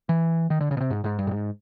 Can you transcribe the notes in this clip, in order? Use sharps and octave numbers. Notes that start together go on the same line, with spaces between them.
E3
D#3
D3
C#3
B2
C3
G#2
G#2
G2
A2
G#2